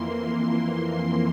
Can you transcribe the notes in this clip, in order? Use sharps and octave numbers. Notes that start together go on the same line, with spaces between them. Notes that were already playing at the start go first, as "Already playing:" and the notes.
Already playing: F2 E3 A#3 C6
C6